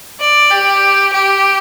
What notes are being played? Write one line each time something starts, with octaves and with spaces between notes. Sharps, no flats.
D5
G4
G4